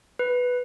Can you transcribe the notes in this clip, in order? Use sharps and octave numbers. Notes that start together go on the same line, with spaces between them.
B4